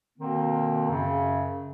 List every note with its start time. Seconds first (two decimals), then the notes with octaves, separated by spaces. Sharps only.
0.19 B2 D3 D#3 A#3 C4
0.90 F#2 C#3